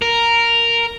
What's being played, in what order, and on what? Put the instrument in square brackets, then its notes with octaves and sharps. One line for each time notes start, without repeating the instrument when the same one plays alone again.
[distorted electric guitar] A#4